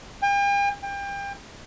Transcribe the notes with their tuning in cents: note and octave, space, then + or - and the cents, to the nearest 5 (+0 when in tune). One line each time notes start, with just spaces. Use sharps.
G5 +45
G5 +30